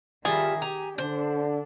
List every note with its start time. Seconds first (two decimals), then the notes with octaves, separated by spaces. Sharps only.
0.25 D#3 G3 F4 G#4 E5
0.62 G4 G#5 A#5
0.98 D3 D4 C5